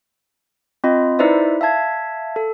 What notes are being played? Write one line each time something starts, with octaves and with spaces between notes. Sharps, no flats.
C4 F4 D#5 B5
D#4 E4 B4 C5 D5 E5
E5 F5 A5 G#6
A4